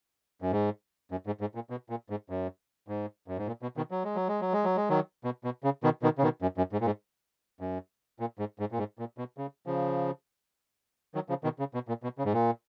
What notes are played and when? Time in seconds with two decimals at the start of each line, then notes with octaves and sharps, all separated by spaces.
0.42 F#2
0.52 G#2
1.11 F#2
1.26 G#2
1.41 G#2
1.55 A#2
1.70 B2
1.90 A#2
2.10 G#2
2.30 F#2
2.88 G#2
3.28 F#2
3.38 G#2
3.47 A#2
3.62 B2
3.77 B2 D#3
3.91 F#3
4.04 G#3
4.16 F#3
4.28 G#3
4.41 F#3
4.53 G#3
4.64 F#3
4.77 G#3
4.89 D#3 F#3
5.24 B2
5.44 B2
5.64 C#3
5.83 B2 D#3
6.02 B2 D#3
6.18 C#3
6.23 B2 D#3
6.42 F#2
6.58 F#2
6.72 G#2
6.81 A#2
6.86 G#2
7.61 F#2
8.20 A#2
8.39 G#2
8.59 G#2
8.72 A#2
8.78 G#2
8.99 A#2
9.18 B2
9.38 C#3
9.66 C#3 F3
11.15 D#3 F#3
11.29 C#3 F3
11.44 B2 D#3
11.59 C#3
11.74 B2
11.88 A#2
12.03 B2
12.18 C#3
12.25 G#2
12.33 A#2